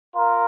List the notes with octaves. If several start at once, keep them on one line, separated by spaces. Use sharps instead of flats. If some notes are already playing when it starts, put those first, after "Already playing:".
F4 A#4